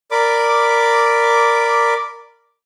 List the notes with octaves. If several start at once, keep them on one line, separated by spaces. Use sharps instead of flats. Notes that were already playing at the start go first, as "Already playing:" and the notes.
A#4 D5 B5 D6